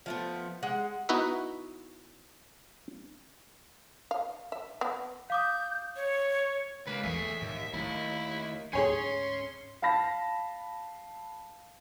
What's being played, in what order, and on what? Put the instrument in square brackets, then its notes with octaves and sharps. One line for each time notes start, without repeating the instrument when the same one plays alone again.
[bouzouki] F3 A3 B3
G#3 F#5
[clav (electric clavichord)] B3 D#4 E4 F#4 B4 E5
[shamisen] F5
E5
B3
[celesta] F5 D6 D#6 [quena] G6
[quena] C#5
[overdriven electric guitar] C#2 A#3 [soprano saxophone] B4
[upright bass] E2 E3 [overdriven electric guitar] A3 G#4 [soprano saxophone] E5
[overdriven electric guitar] D#2 [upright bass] G#2
[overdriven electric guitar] D#2 [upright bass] A3 [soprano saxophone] E4
[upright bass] D2 G#2 [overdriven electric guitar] C#4 [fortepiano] G#4 C#5 G#5 [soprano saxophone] C6
[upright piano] F5 A5 B5 A#6